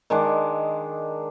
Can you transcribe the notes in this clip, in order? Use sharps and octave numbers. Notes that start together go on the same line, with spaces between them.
D#3 G#3 D4